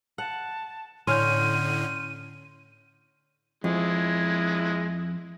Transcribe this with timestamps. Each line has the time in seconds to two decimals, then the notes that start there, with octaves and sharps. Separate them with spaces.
0.18 F#5 A5
1.07 A2 D3 C#4 C6 F6 G6 D#7
3.64 F2 G#3 E4